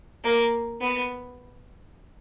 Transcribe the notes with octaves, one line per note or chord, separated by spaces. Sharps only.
A#3
B3